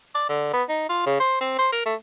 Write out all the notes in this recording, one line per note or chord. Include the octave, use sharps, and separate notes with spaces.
D5
D3
B3
D#4
F4
C#3
C5
C4
C5
A#4
A3